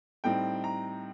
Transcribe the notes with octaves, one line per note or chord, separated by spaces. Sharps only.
A2 G3 C4 D#4 G5
A#5